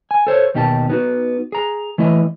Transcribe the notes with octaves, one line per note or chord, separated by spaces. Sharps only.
G#5
A4 C5 C#5
D#2 B2 D#4 G4 G#4 A5
B3 D#4 F#4
G#4 A#5
E3 A3 E4 D#5